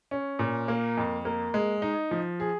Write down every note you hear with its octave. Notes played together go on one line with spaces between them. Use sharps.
C#4
A#2
A#3
F2
A#3
G#3
D#4
F3
G#4